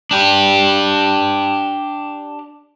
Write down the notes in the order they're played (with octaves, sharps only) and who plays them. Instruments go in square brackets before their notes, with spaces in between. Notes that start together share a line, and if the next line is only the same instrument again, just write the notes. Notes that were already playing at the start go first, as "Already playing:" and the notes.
[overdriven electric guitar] D4 G4